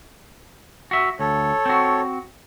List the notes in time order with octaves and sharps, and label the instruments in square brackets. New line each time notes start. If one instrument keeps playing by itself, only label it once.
[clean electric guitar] F#4 E5
[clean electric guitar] D2 [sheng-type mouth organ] A4 C#5
[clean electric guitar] C4 F#4